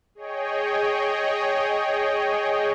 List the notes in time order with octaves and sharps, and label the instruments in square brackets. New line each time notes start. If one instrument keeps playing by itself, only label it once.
[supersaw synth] G#4 C#5 D#5 G5